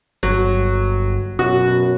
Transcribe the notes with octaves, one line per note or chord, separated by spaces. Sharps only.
G1 F#3
F#2 B2 F#4